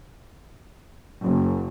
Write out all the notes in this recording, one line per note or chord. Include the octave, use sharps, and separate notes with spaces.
F#1